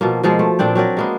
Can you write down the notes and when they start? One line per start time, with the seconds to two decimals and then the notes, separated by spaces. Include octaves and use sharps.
0.01 B2 F3 A#3
0.23 B2 F3 G#3 A#3
0.39 A3
0.59 A#2 C4 D4 G5
0.75 F#3 C4 A#4 D5
0.97 G#3 A#3 B3